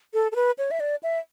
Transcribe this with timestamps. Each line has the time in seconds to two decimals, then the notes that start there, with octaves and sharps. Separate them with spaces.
0.14 A4
0.32 A4
0.36 B4
0.58 C#5
0.71 E5
0.80 D5
1.03 E5